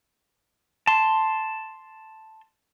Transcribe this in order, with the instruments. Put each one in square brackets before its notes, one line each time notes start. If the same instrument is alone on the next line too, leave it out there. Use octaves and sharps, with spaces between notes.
[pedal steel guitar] A5 C6